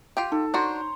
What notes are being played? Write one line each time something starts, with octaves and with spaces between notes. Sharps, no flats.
F4 G4 G5
D#4 A4
D4 F#4 C5 C#5 A#5